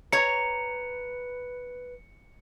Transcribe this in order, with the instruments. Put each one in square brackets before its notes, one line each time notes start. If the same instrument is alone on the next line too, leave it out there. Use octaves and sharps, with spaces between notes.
[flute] B4 [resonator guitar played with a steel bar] C#5 A#5 [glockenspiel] C#7